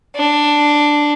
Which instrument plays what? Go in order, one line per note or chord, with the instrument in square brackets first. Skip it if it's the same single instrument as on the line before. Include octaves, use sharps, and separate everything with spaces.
[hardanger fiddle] D4